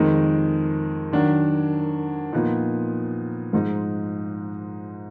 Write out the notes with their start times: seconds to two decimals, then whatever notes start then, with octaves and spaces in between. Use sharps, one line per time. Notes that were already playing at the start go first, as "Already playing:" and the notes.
Already playing: F2 D#3 G#3 D#4
1.13 D#3 F#3 D4
2.33 A#2 F3 B3 D#4
3.53 G#2 F3 G#3 D#4